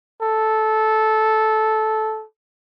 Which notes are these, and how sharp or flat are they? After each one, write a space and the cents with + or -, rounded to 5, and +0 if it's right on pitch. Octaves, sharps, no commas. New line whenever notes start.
A4 -15